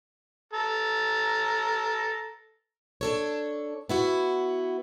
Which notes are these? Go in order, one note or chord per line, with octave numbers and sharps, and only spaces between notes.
A4 A#5
D4 A4 C#5
B3 E4 F#4